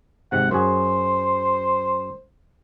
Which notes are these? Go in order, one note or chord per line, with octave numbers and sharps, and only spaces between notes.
G#1 G#2 C3 F#5
F#2 F#4 G#4 C5